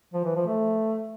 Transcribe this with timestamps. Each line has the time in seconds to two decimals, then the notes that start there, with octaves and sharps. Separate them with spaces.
0.14 F3
0.25 E3
0.36 F3
0.47 A3